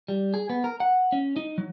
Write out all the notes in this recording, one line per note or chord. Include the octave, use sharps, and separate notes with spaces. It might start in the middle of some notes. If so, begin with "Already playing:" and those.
G3
G#4
B3
A#4
F#5
C#4
D#4
F#3